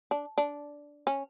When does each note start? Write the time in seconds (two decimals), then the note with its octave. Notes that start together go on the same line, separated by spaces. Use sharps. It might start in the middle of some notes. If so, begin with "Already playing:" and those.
0.11 D4
0.38 D4
1.07 C#4